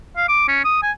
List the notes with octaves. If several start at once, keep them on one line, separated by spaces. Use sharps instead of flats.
F5
D6
C#4
D#6
G#5